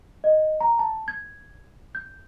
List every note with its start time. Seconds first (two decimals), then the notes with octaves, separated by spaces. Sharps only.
0.24 D#5
0.60 A#5
0.79 A5
1.08 G#6
1.95 G6